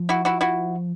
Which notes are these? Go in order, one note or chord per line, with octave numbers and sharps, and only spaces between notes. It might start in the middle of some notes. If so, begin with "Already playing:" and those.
Already playing: F3
E4 F#4
E4 F#4
E4 F#4